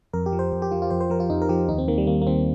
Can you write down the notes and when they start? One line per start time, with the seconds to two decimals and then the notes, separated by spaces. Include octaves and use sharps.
0.13 F2 A#4
0.26 G4
0.33 F3
0.39 C5
0.52 F2
0.62 G4
0.71 F3 F4
0.82 F4
0.90 F2 C5
1.01 C5
1.10 F3 A#4
1.20 F4
1.30 F2 D#4
1.42 A#4
1.49 F3 G4
1.68 D#2 D#4
1.78 C4
1.88 D#3 A#3
1.98 G3
2.07 D#2 A#3
2.22 A#3
2.27 D#3 C4